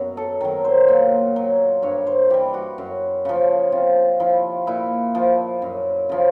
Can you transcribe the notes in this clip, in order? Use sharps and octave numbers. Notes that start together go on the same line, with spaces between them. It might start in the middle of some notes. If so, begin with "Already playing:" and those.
Already playing: F#2 B2 F#3
A4
D#3 F#3 A#4
C5
A#2
F#3
G2 C#5
C5
E3 G3 G4
F#4
F#2
C#3 F3
C3 F4
F3 E4
A#2 E4
F3
F#2
C#3 F3